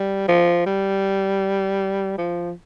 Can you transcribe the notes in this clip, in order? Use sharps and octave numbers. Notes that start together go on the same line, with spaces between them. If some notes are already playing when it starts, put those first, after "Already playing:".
Already playing: G3
F3
G3
F3